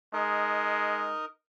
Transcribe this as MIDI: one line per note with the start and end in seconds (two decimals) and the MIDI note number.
0.13 1.13 56
0.13 1.25 63
0.13 1.25 70
0.13 1.25 75